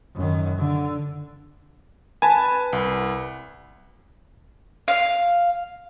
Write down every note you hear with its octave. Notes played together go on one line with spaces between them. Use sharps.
F#2 D#3
D3
B4 G#5 A5
C2
F5